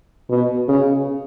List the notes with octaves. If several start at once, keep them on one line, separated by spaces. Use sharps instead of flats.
B2
C#3